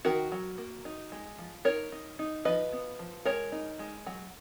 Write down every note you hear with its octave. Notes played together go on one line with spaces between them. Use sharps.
D#3 F#4 A#4
F#3
A#3
D#4
G#3
F3
D#4 A#4 C#5
D#4
D#4
F3 B4 D#5
B3
F3
G#3 A#4 C#5
D#4
G#3
F#3